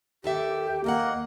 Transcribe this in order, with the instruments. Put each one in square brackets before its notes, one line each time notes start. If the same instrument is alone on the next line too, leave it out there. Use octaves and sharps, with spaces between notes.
[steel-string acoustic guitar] D#2 A4 E5 [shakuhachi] G4
[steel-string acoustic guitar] D#2 D#5 F#5 [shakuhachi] A#3